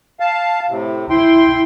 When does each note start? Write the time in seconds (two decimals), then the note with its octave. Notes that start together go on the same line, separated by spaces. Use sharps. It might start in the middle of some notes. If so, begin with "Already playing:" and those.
0.20 F5 A5
0.69 A2 C3
1.10 E4 G5 C6